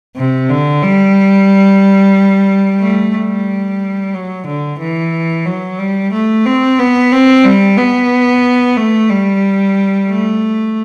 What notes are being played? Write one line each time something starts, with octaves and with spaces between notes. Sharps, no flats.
C3
D3
G3
A3
G3
F#3
D3
E3
F#3
G3
A3
C4
B3
C4
G3
B3
A3
G3
A3